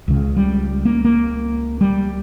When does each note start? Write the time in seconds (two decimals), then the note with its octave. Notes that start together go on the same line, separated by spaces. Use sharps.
0.08 C#2 C#3
0.37 G3
0.85 A#3
1.05 A#3
1.81 G3